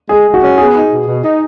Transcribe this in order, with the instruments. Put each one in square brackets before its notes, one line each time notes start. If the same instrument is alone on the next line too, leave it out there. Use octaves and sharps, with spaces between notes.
[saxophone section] G#3 [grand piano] G#4
[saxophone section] G#3
[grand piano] F#4
[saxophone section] C#4
[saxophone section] B3 [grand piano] G#4
[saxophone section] D#4
B2
B2
D#4